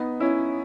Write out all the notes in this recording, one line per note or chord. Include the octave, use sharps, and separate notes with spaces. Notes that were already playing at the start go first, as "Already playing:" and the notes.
Already playing: B3 D#4
C#4 E4